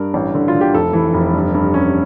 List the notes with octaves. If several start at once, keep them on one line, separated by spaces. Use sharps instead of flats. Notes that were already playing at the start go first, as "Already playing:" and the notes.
Already playing: G2 A#4
A1
D3
F4
D3
G4
F1 A4
E3
F1
G2
G2
C#4